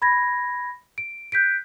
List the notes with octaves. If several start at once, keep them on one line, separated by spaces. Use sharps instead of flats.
B5 G#6 A#6
D7
F#6 G6 B6 D7